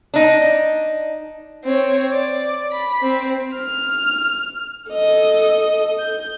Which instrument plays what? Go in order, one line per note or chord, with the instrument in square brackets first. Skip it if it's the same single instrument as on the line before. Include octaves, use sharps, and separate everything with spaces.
[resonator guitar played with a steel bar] D4 D#4
[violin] C4 C#5
D5
B5
C4
[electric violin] F6
A4 D#5
G6